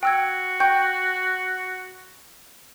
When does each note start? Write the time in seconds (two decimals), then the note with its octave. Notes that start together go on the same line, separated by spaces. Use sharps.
0.03 F#4 G5 E6 G#6
0.60 G5 C#6 G6